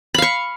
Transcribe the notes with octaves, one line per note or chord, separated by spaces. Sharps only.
F5 B5 C#6